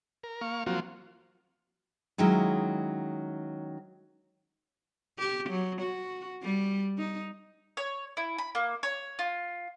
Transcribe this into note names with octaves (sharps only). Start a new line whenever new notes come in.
A#4
A#3 F5 C#6
F3 F#3 A#3 C4 F4 F#4
D#3 F#3 G#3 C#4 E4
G4
F#3
F#4
G3
D#4
C#5
E4
B5
A#3
C#5
F4